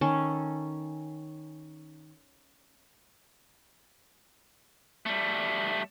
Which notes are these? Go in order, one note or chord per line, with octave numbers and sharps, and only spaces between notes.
D#3 C#4 A4
G3 A3